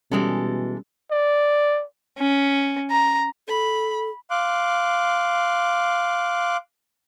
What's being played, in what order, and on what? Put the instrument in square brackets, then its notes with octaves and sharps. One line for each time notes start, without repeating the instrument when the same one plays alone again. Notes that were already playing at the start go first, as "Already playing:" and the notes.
[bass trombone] B2 [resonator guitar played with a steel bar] E3 G#3 A4 [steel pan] G3 C#4
[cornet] D5
[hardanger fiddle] C#4
A#5
[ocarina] A4 [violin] B5
[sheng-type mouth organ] F5 C6 D6 F#6